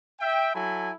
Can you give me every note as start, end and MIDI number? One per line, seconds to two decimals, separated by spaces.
0.20 0.54 76
0.20 0.54 79
0.54 0.92 54
0.54 0.92 64
0.54 0.92 69
0.54 0.92 80
0.54 0.92 83